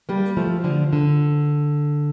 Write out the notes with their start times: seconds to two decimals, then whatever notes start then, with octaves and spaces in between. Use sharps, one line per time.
0.09 G3 A#3
0.37 F3 A3
0.64 D3 F3
0.93 D3